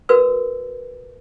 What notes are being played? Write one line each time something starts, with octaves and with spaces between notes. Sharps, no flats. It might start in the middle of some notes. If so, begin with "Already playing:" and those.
F#4 A#4 B4 E6